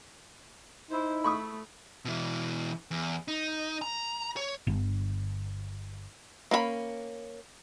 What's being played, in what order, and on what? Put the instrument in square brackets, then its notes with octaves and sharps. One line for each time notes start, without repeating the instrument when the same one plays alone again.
[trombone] D#4 [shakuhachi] E4 [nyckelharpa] C5
[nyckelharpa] A3 [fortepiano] B5 C#6 D#6
[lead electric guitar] B2 E3
E2
D#4
A#5
C#5
[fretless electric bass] G1
[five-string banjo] A#3 C#4 A#4 B5